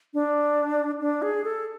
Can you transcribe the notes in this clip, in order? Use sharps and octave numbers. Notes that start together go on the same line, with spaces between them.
D4
D4
G#4
A4